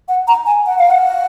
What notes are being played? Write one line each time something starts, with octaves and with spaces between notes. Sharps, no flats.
F#5
A#5
G#5
F#5
F5
F#5